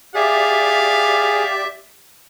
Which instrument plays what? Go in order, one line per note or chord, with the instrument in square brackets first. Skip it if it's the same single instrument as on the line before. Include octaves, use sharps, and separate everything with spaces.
[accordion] G4 D5 [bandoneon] G#4 [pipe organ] E5 [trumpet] F5